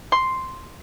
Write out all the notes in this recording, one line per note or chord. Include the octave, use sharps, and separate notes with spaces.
C6